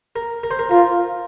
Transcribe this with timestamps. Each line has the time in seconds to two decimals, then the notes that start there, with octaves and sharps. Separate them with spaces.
0.16 A#4
0.43 A#4
0.51 C5
0.59 A#4
0.70 F4 A#4